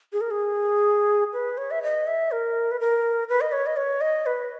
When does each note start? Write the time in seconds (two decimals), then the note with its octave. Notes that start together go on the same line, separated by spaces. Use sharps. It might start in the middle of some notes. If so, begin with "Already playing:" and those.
0.13 G#4
0.21 A#4
0.31 G#4
1.33 B4
1.58 C#5
1.71 E5
1.83 D#5
2.07 E5
2.31 A#4
2.71 B4
2.80 A#4
3.29 B4
3.41 D#5
3.52 C#5
3.66 D#5
3.77 C#5
4.01 D#5
4.26 B4